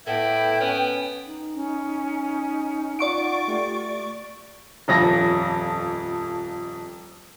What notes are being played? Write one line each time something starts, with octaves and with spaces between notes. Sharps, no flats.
A2 B3 E4 G5
B3 C#4
D#4
C#4
F4 D5 F#5 C#6 D7
A3 G4
D#1 F2 A#6